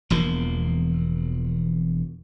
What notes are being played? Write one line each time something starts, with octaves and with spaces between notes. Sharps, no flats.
E1 E2 F3 A#3